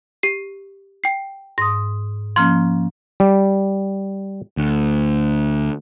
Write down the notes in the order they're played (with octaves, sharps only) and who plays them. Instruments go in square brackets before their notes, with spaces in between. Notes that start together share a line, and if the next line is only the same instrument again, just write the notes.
[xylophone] G4 C7
G5 C7
[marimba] G#2 D#6 [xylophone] A#6
[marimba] F3 A#3 C#4 [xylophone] C6 F6
[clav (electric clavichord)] G3
[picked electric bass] D2